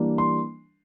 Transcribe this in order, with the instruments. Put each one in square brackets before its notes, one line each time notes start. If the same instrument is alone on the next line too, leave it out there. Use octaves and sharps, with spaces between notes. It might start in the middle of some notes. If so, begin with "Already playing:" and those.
Already playing: [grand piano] E3 G3 A#3 D4
C6